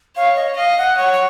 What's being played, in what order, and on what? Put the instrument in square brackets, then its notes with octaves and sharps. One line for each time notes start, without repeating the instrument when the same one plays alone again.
[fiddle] C#5 [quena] F5
[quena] D#5
[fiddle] D#5 [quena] F5
[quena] F#5
[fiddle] C#5 [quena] F#5
[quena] F#5